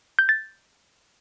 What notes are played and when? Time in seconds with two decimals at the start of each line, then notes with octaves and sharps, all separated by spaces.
0.19 G6
0.29 A6